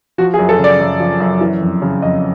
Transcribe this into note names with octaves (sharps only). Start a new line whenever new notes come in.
F3 F#4
G#4
F#2
A4
C#3
D5
F#2
F3
F#2
E3
F2
C#3
F2 D#5